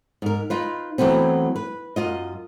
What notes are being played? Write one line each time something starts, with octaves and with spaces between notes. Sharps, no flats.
G#2 A#4
D#4 F4 B4
E3 F#3 A3 B3 C4
B4
F#2 F4 D#5